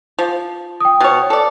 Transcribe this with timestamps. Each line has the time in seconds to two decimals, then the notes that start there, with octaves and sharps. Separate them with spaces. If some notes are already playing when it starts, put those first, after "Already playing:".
0.19 F3
0.80 G5 D#6
1.01 B2 C#5
1.30 A4 D5